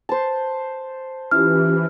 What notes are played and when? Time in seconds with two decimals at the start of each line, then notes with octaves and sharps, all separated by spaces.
0.09 C5 A5
1.31 E3 C#4 F4 G4 F6